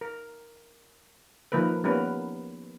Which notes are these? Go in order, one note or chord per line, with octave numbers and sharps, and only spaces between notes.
A#4
D#3 F3 A#3 A#4 B4
G3 A#3 B3 C#4 A#4 B4